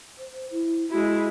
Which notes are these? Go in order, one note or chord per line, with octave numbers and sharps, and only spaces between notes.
C5
E4
G#3 E4 F#4